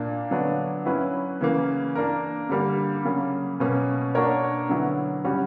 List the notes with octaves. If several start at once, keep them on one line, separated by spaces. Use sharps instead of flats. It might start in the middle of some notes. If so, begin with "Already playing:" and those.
Already playing: A#2 A#3 D4
D3 F#3 B3 D4
F#3 C#4 E4 B4
C#3 E3 A#3
A#3 D4 A#4
D3 G3 A#3
C#3 F#3 A#3
B2 A#3 C#4
A#3 D4 F#4 A#4 C#5
D3 F#3 B3 E4
C#3 G3 C#4 F#4